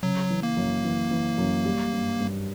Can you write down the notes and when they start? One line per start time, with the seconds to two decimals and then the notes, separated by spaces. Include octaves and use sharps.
0.03 C#3 F#3
0.30 E3
0.43 A#3
0.57 F#2
0.85 E3
1.11 E3
1.38 F#2
1.65 G3
1.93 G2
2.20 G2